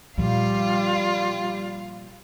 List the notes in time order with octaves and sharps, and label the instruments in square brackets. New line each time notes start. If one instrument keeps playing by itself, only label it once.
[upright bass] A#2 F3 [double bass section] G3 [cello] F4 F5